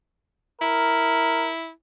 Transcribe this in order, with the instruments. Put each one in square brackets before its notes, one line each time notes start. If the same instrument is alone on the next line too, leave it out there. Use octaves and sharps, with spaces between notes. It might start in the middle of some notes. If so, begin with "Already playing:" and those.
[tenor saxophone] E4 [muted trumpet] A#4